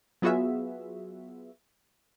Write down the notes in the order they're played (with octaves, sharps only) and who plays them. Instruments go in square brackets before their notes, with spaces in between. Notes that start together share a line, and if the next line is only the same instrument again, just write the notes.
[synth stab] F#3 B3 F4 F#4 G#4 E5